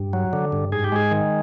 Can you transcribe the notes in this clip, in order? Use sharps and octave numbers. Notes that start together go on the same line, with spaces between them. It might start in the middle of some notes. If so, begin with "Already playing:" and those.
Already playing: G2
F#3
D3
G2
G#2 G#4
G4
G#3 G#4
D#3